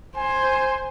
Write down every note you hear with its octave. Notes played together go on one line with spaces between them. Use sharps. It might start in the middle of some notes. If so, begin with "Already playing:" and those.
C5 G#5